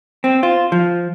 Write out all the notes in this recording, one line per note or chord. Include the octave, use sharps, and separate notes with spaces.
C4
F4
F3